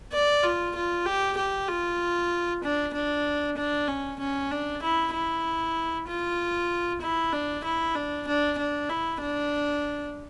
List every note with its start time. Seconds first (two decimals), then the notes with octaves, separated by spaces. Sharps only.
0.13 D5
0.43 F4
0.75 F4
1.06 G4
1.37 G4
1.68 F4
2.63 D4
2.93 D4
3.57 D4
3.88 C#4
4.19 C#4
4.51 D4
4.83 E4
5.13 E4
6.08 F4
7.01 E4
7.33 D4
7.64 E4
7.95 D4
8.27 D4
8.58 D4
8.89 E4
9.21 D4